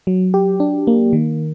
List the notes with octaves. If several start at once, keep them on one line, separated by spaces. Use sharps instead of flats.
F#3
G4
D4
A#3
D#3